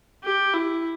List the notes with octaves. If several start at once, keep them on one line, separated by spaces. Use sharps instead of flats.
G4
E4